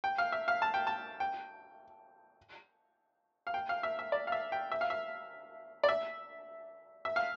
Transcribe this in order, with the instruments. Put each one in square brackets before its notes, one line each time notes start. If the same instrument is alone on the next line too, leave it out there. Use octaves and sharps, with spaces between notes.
[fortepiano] G5
F5
E5
F5
A5
G5
A5
G5
F5
G5
F5
E5
E5
D5
F5
E5
G5
E5
F5
E5
D5
E5
E5
F5